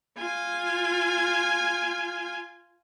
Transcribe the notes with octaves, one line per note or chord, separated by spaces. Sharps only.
F4 G#5